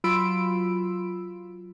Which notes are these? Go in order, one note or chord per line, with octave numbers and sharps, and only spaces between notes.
F#3 F4 B5 C6 E6 D7